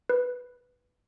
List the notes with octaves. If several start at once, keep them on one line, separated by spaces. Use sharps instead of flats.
B4